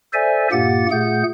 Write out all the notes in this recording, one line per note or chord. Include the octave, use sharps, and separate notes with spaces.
A4 C5 D5 E5 G#5
G2 A#2 A#3 G4 F#5 A6
A#2 A3 G#4 F#5 G6